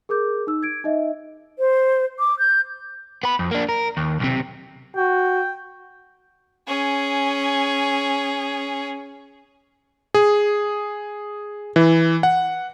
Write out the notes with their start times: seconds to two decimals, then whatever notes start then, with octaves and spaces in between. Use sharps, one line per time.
0.09 G#4 A#4 D6 G6
0.47 D#4 E6
0.63 G#6 D7
0.84 D#4 D#5 E5
1.59 C5
2.19 D6
2.39 G6
3.23 B3 B5
3.39 F2
3.51 A#3 D4
3.69 A#4
3.97 D#2
4.20 B1 C3
4.96 F#4 G5
6.67 C#4 G#4
10.14 G#4
11.76 E3
12.23 F#5